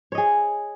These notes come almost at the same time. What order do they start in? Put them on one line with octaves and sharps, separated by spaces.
C#5 D#5 G#4